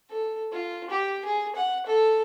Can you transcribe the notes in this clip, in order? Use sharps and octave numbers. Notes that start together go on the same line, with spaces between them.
A4
F4
G4
G#4
F#5
A4